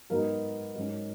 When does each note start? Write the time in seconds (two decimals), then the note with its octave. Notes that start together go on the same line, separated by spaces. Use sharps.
0.10 G#2 F#3 B3 D#4 A#4
0.75 G#2 F#3 C#4